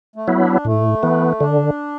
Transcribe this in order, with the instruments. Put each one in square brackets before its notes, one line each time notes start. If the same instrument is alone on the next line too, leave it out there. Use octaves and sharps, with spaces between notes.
[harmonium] A3
[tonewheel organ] F#3 B3 E4
[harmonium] D4
[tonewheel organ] A2 [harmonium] A3
[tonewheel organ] E3 B3
[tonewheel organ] D3 [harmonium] D4